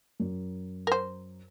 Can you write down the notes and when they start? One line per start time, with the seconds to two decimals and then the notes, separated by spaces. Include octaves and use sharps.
0.20 F#2
0.87 A#4 C5